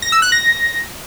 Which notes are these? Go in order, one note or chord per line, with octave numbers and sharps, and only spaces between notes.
A#6
E6
F#6
A#6